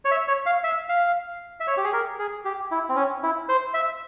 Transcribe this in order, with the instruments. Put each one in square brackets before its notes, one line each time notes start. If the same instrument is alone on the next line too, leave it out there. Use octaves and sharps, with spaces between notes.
[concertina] C#5
E5
C#5
F5
E5
F5
E5
C#5
G4
G#4
A#4
G#4
G4
E4
C4
C#4
E4
C5
E5